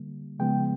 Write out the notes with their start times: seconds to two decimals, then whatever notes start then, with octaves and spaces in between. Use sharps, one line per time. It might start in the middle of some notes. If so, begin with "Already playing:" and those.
Already playing: D3 G3 A#3
0.39 C#3 F3 G#3 B3 G5